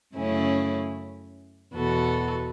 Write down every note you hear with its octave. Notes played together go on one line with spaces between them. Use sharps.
F#2 C#3 A3 C#4 E4
E2 B2 B3 F#4 A4